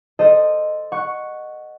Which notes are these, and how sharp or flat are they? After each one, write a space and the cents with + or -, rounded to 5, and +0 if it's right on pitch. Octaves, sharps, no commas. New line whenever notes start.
A4 +0 C5 -5 D#5 -15
F#5 +0 C#6 +0